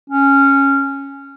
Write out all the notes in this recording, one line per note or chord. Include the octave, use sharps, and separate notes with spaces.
C#4